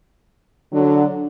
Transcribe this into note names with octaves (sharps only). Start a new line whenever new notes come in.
D3 F#3 D4